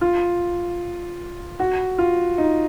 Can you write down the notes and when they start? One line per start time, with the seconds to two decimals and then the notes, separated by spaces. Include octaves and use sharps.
0.01 F4
1.60 F#4
1.98 F4
2.38 D#4